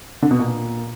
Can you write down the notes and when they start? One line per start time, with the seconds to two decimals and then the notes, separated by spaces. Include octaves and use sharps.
0.22 D3
0.31 B2
0.39 A#2